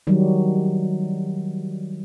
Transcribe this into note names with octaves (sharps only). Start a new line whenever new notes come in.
D#3 F#3 G3